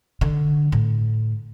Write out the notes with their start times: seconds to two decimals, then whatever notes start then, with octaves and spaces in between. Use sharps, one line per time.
0.21 D3
0.72 A2